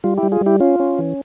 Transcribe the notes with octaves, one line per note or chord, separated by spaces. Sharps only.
G3 F4
E4 G4
G3
F4 G#4
G3
E4 G4
C#4 F4
C#4
E3